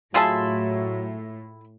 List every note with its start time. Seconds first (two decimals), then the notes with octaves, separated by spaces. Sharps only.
0.14 A2 F#3 E4 F4 G#4 E5 A5 C6